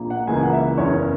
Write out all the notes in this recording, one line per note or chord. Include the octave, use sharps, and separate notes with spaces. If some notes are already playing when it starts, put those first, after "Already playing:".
Already playing: A#1 A#2 A#3
F#5
C#2 C#3 E3 A#3 G#5
F#5
E5
F#1 E2 C#3 C#5